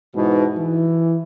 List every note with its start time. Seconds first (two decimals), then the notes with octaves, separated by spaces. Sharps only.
0.15 G#2 B2 E3
0.57 E3